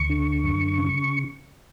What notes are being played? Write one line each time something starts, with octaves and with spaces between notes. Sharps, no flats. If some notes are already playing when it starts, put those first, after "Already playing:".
Already playing: D2 C#6
D3
F#2
C#3